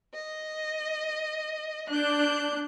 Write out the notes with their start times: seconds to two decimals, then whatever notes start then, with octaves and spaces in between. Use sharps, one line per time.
0.14 D#5
1.90 D4 F#6 G6